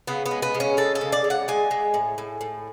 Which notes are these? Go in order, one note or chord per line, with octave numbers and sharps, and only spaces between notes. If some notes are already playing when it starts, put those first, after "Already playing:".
C#3 B3
B3
G#3
B3
C#3
C#4
G#3 A4
A4
C#3
D5
G#3
F#5
G#3 G#5
G#3
A2
A2
A2